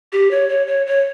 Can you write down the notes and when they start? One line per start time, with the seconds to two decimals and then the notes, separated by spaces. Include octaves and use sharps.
0.13 G4
0.31 C#5
0.49 C#5
0.67 C#5
0.87 C#5